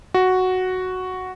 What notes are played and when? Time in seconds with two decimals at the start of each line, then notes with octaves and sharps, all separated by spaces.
0.14 F#4